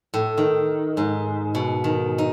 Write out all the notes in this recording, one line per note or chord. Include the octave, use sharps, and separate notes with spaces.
A2
D#3
G#2
B2
D#3
D#4